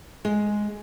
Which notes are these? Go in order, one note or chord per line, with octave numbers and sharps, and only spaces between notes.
G#3